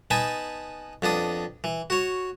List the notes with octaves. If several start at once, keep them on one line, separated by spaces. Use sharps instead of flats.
B3 D#4 G#5 A5 B5
F2 B3 D4 D#6
E3
F#4 C#5